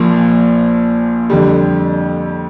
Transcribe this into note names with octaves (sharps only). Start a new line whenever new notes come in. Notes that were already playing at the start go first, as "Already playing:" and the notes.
Already playing: A#1 A#2 F3
F2 D3 G3